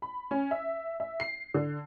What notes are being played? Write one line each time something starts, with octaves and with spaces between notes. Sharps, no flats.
B5
C#4
E5
E5
C7
D3